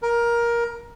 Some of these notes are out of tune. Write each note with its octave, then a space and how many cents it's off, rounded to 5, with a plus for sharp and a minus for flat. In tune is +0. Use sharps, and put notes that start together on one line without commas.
A#4 +15